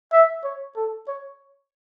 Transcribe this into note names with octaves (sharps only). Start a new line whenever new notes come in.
E5
C#5
A4
C#5